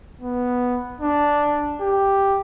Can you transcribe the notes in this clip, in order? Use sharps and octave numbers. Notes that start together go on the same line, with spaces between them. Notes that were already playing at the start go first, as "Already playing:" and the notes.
B3
D4
G4